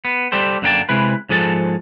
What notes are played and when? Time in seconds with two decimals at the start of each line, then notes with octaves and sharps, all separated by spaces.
0.05 B3
0.32 G3 G4 A4 C5
0.62 F#2 D3 A#3 D4 G5 A5
0.89 C3 G#3 E4 B4
1.29 G#2 F3 G#4 A4 A5